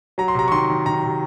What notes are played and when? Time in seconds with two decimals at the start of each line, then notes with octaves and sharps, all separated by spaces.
0.18 F#3 A#5
0.28 C6
0.35 C3 A#5
0.48 C#6
0.52 D#3 C6
0.70 D#3
0.86 D#3 A#5
1.03 C3